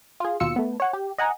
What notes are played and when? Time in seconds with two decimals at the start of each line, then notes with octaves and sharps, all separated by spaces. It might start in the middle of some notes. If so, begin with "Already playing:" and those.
0.20 F4 G#4
0.40 D#2 B2 F4 E6 C#7
0.56 A3 B3
0.80 C#5 F#5
0.93 G4
1.18 D#5 F#5 G#5 A#5